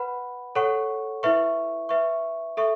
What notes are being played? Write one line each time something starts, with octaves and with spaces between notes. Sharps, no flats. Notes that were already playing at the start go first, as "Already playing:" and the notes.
Already playing: B4 F#5 B5
A4 C#5 F#5 C#6
E4 B4 E5 C#6
B4 E5 C#6
A4 E5 C#6